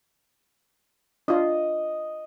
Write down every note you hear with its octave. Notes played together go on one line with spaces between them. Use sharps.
D4 F4 D#5